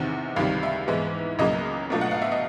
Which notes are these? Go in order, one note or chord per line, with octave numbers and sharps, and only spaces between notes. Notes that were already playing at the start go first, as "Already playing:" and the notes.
Already playing: E2 C3 D#3
C#2 C3 D#3 G3 F5
E5
G#2 E3 G#3 B3 E4
C#2 C#3 F#3 A#3 D#5
B2 F#3 A3 D4 F4
F#5
F5
E5
D#5